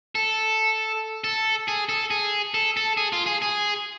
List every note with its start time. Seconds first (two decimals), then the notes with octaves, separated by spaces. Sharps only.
0.15 A4
1.24 A4
1.68 G#4
1.89 A4
2.11 G#4
2.54 A4
2.77 A4
2.97 G#4
3.13 F4
3.26 G#4
3.42 G#4